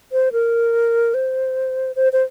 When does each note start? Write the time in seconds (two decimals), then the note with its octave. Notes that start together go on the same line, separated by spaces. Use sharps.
0.12 C5
0.32 A#4
1.14 C5
1.96 C5
2.13 C5